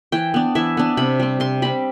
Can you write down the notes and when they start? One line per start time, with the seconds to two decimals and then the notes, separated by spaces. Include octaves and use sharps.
0.12 E3 G5
0.34 B3 D4
0.55 E3 E5
0.77 B3 D4
0.97 C3 B5
1.20 G3 C4
1.40 C3 C6
1.62 G3 C4 B5